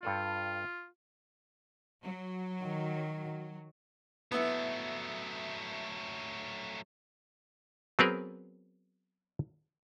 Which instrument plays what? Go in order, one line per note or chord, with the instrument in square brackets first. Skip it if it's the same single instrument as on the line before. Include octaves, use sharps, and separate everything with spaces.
[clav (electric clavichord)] G2 A4 D5 [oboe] F4
[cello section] F#3
[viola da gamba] D#3
[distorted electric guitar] F#3 A3 [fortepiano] B3 E4
[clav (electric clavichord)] F#3 B3 C4 G#4 A#4 B4